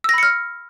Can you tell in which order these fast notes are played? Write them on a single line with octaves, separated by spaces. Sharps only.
E6 A#6 B5 C#7 F6